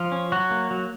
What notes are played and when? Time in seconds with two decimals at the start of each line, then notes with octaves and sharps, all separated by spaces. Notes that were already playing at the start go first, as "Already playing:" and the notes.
Already playing: F3 F4
0.12 C#4
0.32 F#3 F#4
0.51 A#3
0.71 F#3